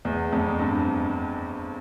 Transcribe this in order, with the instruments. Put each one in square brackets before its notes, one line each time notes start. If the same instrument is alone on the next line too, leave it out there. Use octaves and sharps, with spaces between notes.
[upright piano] E2
F2
G2